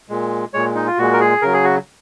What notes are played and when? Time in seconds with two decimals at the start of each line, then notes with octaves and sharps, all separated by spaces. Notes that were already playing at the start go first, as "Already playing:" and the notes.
0.09 A#2 G#3
0.54 A#2 G#3 C#5
0.75 D#4
0.87 F4
0.98 A#2 G#3 F#4
1.13 A#4
1.20 G#4
1.42 C#3 F#3 A#4
1.53 G#4
1.64 F#4